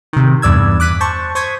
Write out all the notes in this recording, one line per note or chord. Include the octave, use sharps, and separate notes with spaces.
C3 D#3
E2 G2 D5 E6 G#6
D6 F#6 B6 D#7
C5 A5 C#6
C5 C#6 D#6 G#6 B6